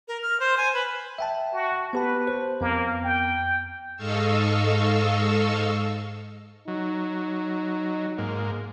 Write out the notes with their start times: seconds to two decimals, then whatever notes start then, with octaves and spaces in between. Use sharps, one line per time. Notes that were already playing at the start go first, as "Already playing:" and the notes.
0.08 A#4
0.22 F6
0.40 C5
0.57 G#5
0.74 B4
1.18 E5 G5 A5
1.53 F#4
1.93 B3 G4 B4 A5
2.27 C5
2.61 F2 A#3 B3
3.05 G5
3.97 G#2 A4 D#5 F5 C#6 E6
6.68 F#3 D#4
8.18 G#2 A#3